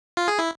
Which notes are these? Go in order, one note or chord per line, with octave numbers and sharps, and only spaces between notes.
F4
G#4
E4